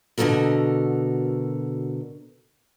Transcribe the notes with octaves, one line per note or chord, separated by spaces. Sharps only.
B2 D3 F#3 F#4 A4 A#4